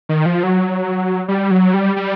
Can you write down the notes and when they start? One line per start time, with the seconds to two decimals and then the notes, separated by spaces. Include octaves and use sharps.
0.09 D#3
0.26 F3
0.43 F#3
1.28 G3
1.51 F#3
1.74 G3
1.96 G3